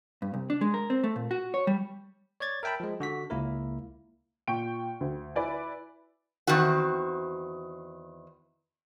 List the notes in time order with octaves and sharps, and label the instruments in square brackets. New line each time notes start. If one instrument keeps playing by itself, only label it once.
[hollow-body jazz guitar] G2
C2
D4
G#3
A#4
C4
A3
A#2
F#4
C#5
G3
[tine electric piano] C#5 D5 G#6 A6
A#4 E5 G5 A5 B5
F3 G#3
D3 F#4 B6
C#2 A#3 E4 A#4
[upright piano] A#2 G5 C#6 D7
D2
E4 B4 D5 G#5
[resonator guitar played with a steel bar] E2 D#3 C4 F#4 F#5